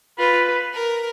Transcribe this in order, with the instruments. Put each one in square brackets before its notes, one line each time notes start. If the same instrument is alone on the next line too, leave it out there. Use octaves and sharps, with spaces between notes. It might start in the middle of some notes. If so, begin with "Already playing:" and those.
[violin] F4 [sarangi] B4
[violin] A#4